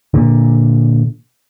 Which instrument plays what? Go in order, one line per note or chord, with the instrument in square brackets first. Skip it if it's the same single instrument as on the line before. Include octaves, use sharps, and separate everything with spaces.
[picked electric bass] A#2 D3